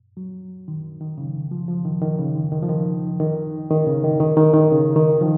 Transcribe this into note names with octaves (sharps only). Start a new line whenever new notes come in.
F#3
D#3
D#3
C#3
D#3
F3
F3
D#3
D#3
C#3
D#3
D#3
F3
D#3
D#3
D#3
C#3
D#3
D#3
D#3
D#3
C#3
D#3
F3